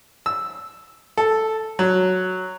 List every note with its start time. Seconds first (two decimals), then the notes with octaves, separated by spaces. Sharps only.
0.26 E6
1.17 A4
1.79 F#3